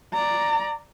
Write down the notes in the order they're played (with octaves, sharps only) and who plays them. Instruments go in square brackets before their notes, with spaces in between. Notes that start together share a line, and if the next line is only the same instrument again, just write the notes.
[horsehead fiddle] D5 A#5